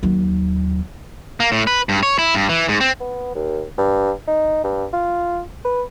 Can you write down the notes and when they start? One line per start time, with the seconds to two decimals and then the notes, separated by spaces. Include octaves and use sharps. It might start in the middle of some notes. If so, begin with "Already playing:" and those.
0.03 D#2 F#3
1.40 A#3
1.52 A2
1.67 B4
1.89 G2
2.03 C#5
2.19 E4
2.34 G2
2.49 E3
2.68 G#2
2.80 C4
3.00 B3
3.35 D#2
3.78 G2
4.27 D#4
4.64 G2
4.93 F4
5.65 B4